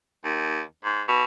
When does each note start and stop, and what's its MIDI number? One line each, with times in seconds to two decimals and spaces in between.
0.24 0.61 39
0.84 1.02 44
1.08 1.24 47